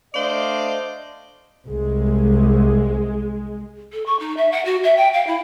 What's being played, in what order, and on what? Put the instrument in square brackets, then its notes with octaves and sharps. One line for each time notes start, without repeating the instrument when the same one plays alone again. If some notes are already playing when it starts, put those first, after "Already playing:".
[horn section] A3 D4 C5 D5 D#5 F5
[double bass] C2 [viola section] G#3
[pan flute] A4
C#6
D#4
E5
F#5
F#4
E5
G5
F5
E4